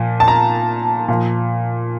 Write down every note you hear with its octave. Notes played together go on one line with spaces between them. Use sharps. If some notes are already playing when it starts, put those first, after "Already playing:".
Already playing: A#2 F3
A5
A#5
A#2 F3